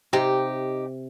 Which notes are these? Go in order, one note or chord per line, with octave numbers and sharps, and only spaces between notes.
C3 D#4 G4 D6